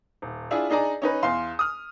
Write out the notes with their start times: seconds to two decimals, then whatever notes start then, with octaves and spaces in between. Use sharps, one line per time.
0.22 D#1
0.51 D4 E4 F4 G#4
0.70 D4 D#4 G#4 D5 A#5
1.02 C#4 D#4 B4
1.23 E2 F5 C6
1.59 D#6 F6